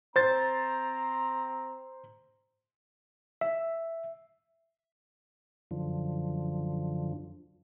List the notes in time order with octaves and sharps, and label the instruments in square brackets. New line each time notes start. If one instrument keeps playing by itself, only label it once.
[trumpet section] C4 A#5 [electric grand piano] C5 A6
[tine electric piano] E5
[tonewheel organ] F#2 D3 F3